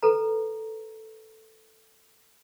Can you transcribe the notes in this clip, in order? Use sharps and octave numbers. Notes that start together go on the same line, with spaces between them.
A4 B4 A#5